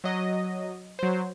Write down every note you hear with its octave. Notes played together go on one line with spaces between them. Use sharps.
F#3 D#5
F#3 C5